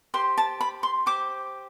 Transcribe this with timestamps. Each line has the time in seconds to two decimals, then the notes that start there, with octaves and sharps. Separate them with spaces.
0.14 G4 C5 C6
0.38 A5
0.61 B5
0.83 C6
1.06 G4 C5 D6